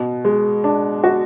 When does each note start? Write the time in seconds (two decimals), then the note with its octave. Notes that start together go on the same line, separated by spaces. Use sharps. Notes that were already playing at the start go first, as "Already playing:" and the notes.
Already playing: B2
0.25 G#3
0.64 D4
1.04 F#4